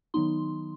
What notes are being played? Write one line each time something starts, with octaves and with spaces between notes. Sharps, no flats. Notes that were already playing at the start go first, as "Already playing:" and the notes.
D#3 F#3 B3 D#4 C6